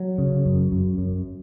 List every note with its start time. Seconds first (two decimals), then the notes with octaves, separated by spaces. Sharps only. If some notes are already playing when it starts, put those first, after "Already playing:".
Already playing: F#3
0.18 C#3
0.45 F#2
0.72 F#2
0.98 F#2